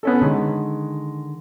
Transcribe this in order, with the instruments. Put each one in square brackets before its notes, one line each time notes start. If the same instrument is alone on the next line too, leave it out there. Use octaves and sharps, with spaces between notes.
[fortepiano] B3 C#4 A4
[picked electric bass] D3 D#3 [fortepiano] G#3